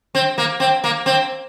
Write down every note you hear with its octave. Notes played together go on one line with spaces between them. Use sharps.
C4
A#3
C4
A#3
C4